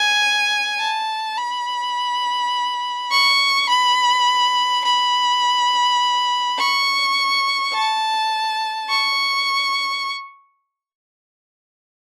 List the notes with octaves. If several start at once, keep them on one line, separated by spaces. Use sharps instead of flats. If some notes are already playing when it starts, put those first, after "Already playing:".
Already playing: G#5
A5
B5
C#6
B5
B5
C#6
A5
C#6